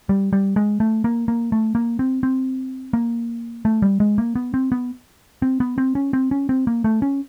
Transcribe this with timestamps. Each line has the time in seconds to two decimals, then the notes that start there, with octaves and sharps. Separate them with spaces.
0.09 G3
0.33 G3
0.56 G#3
0.80 A3
1.04 A#3
1.28 A#3
1.52 A3
1.75 A#3
1.99 C4
2.23 C4
2.93 A#3
3.65 A3
3.82 G3
4.00 G#3
4.18 A#3
4.35 B3
4.54 C4
4.72 B3
5.42 C4
5.60 B3
5.78 C4
5.95 C#4
6.13 C4
6.31 C#4
6.49 C4
6.67 A#3
6.84 A3
7.02 C#4